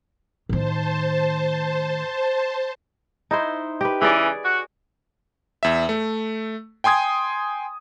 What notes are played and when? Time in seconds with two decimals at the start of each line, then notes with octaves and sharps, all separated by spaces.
0.49 A2 D#3 C5 A5
3.31 D#4 E4 C5
3.81 G4 B4
4.02 C#3 E3 G#4 C#5 D5
4.45 F#4
5.63 E2 E5
5.89 A3
6.84 G5 G#5 C6 D#6 G#6